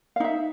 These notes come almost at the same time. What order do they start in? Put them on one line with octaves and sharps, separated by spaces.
F5 D#4 E5